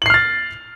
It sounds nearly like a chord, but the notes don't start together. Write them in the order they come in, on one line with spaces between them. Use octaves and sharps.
F#7 C7 F6 A6